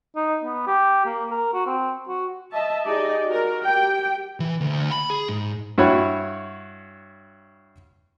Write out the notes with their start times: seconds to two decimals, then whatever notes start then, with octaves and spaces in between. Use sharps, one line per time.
0.16 D#4
0.44 B3
0.67 G4
1.06 A#3
1.31 A#4
1.54 F#4
1.66 C4
2.08 F#4
2.51 D#5 E5 A5
2.85 D#4 G4 G#4 D5 D#5
3.27 F#4 A#4
3.64 G4 G5
4.40 E3
4.61 D2
4.91 B5
5.10 G#4
5.29 G#2
5.78 G2 E4 F#4 C#5 B5